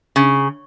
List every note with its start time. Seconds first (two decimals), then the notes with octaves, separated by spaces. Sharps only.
0.16 C#3